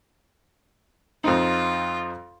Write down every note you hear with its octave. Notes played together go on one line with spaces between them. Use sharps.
F2 C4 D#4 F4